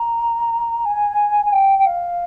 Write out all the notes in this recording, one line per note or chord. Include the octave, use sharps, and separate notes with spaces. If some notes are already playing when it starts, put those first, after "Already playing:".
Already playing: A#5
G#5
G#5
G5
G5
F5